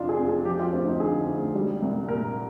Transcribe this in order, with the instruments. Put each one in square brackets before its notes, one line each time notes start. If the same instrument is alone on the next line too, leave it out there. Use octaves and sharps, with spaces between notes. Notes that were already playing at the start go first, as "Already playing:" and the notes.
Already playing: [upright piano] F2 C3 D4 D#4 F4
G#4
F2
G#4
F3 G4
F4
D2 C4
D#4
D3 G#4
D2
G3
C2
A#2 A#4